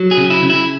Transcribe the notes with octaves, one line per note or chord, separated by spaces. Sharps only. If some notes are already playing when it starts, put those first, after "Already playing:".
Already playing: F#3
G#4
C#3
E4
C#3
E4